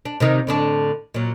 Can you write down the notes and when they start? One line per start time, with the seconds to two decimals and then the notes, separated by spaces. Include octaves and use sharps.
0.05 D4
0.20 C3 D#3 D#4
0.47 A2 D3 D4
1.14 A#2 F#3